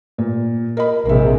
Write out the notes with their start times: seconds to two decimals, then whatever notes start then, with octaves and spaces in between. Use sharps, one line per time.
0.18 A#2
0.77 A#4 D#5 B5
1.06 A#1 C3 G#3 A#4 E5